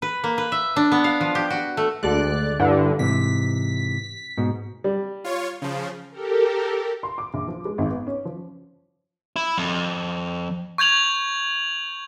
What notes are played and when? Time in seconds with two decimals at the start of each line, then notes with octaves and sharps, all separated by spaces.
0.02 B4
0.24 A#3
0.38 B4
0.52 E5
0.76 D4
0.92 B3
1.04 F5
1.21 F3
1.35 G4
1.50 F#4
1.77 A3
2.03 D2 G#3 A4 D5 F#6
2.60 G2 D3 E4
2.99 G#2 C3 E3 B6
4.37 G#2 B2
4.84 G3
5.24 F4 C#5
5.62 C#3 F3
6.11 G4 A4 A#4
7.03 C6
7.18 D6
7.34 A#1
7.48 F3
7.65 G#3
7.78 G#1
7.90 B3
8.07 C#4
8.25 F3
9.36 E4
9.58 F2
10.78 C#6 G6 G#6 F7 F#7